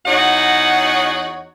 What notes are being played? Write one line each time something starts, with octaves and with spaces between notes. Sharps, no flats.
E2 D#4 F#4 C#5 F#5